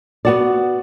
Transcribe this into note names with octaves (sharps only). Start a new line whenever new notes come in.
B3 F#4 D5